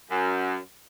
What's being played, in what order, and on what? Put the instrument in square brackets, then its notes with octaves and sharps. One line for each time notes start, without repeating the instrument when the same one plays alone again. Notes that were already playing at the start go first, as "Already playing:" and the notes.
[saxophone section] F#2